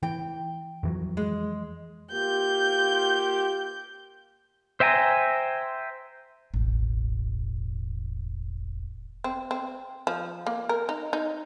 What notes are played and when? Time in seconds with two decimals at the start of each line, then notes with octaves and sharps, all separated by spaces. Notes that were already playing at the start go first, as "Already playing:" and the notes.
0.03 E3 G5
0.83 F2 E3 F#3
1.17 G#3
2.13 A#3 F4 G4 G6
4.80 C5 E5 G5 G#5 A#5
6.54 E1 A1
9.24 C4
9.51 C4
10.07 F3
10.47 A#3
10.69 A#4
10.89 D#4
11.13 D#4